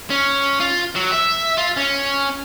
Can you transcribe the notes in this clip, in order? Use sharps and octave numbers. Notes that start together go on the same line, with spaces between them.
C#4
F4
F#3
E5
F4
C#4